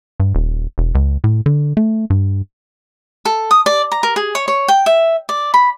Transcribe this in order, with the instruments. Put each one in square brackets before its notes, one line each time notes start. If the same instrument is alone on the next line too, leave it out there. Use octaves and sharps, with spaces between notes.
[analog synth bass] G2
D#1
E1
C#2
A2
D3
A3
G2
[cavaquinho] A4
D#6
D5
A#5
A#4
G#4
C#5
C#5
G5
E5
D5
B5